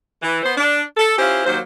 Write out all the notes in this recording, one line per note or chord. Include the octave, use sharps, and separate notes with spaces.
E3
B3 C5
D4
A4
C#4 E4 F4 G4 C5
D#2 F#3 A#3 C5